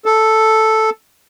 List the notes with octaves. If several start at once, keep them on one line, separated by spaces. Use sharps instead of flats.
A4